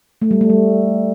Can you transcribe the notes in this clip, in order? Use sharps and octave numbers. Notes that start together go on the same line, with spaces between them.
A3
G3
A3
G3